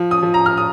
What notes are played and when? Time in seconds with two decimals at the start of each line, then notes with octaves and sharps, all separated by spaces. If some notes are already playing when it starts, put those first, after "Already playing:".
Already playing: F3
0.11 D#6
0.23 F3
0.34 A#5
0.46 F6
0.57 D#6